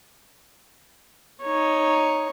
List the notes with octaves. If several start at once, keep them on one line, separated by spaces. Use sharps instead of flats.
D#4 C#5